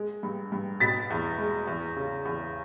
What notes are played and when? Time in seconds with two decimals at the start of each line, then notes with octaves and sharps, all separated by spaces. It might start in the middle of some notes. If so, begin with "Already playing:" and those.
Already playing: G#3
0.23 G2
0.52 G2
0.80 B2 A6 B6
1.10 E2
1.38 G#3
1.67 E2
1.96 C#3
2.25 E2